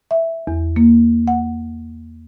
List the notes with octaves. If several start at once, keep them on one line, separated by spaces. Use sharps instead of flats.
E5
E2
A#3
F#5